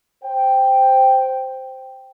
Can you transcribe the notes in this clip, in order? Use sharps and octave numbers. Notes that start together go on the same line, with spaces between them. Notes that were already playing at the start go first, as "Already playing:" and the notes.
C5 G5